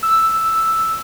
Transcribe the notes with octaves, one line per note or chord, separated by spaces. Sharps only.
E6